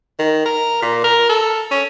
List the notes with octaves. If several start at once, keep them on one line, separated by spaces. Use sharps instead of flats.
D#3
A#4
A#2
A#4
A4
C#4